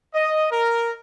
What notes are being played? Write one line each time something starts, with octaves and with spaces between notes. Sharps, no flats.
D#5
A#4